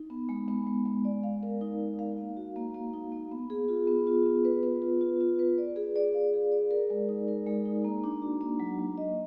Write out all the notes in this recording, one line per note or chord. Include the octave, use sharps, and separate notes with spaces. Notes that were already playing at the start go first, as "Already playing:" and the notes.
Already playing: D#4
B3
G#3
B3
G#3
G#3
D5
F5
A#4
D#4
D#4
F5
A#3
F#4
A#3
A#3
D#4
A#3
B3
G#4
F4
B3
F4
B3
B4
B4
F4
F4
F4
B4
D5
G#4
D5
F5
G#4
D5
A#4
G#3
D#4
A#4
G#3
D#4
A#3
D4
F#4
A#3
F#3
F#3
D#5